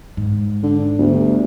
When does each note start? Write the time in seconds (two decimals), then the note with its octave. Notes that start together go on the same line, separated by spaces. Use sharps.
0.17 G#2
0.63 D3
0.98 G1 D2